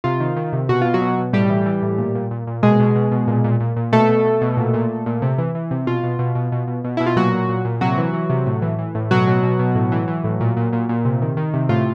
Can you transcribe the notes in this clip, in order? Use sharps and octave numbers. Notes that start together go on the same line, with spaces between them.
C3 F4
D#3
D#3
C3
B2 F#4
B2 F4
F#3 F#4
B2
B2
A2 G3 G4
E3
E3
A2
A#2
A#2
A#2
A#2
B2 G#3 G#4
B2
B2
B2
A#2
A#2
A#2
A#2
B2 A3 A4
B2
B2
B2
A#2
A#2
A#2
A#2
C3
E3
E3
C3
B2 F4
B2
B2
B2
B2
B2
B2
B2 E4
F4
A#2 F#3 F#4
A#2
A#2
A#2
C3 F#3 F#4
E3
E3
C3
A2
E3
E3
A2
B2 F#3 F#4
B2
B2
B2
A2
E3
E3
A2
A#2
A#2
A#2
A#2
C3
D#3
D#3
C3
A2 F4